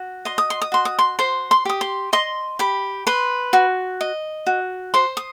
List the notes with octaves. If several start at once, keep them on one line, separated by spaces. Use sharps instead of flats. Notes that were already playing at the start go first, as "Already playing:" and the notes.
Already playing: F#4
D#5 C6
D#6
C6
D#6
F#4 C6
D#6
C6
C5 C6
C6
G4 D#6
C6
D#5 C6
G4 B5
B4 C6
F#4
D#5
F#4
C5 C6
D#6